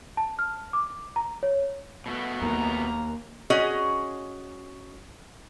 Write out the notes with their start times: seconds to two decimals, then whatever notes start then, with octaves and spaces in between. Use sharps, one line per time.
0.17 A5
0.39 F6
0.73 D6
1.16 A#5
1.43 C#5
2.06 B2 A3 B3
2.42 D#2 A#3 A#5
3.50 C#4 F#4 G#4 D#5